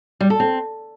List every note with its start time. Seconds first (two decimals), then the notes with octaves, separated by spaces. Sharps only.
0.21 G3
0.30 A4
0.40 C4